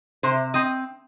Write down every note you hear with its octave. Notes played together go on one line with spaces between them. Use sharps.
C3 C5
C4 D#5